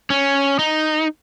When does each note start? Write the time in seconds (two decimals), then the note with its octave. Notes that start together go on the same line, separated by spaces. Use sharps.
0.10 C#4
0.59 D#4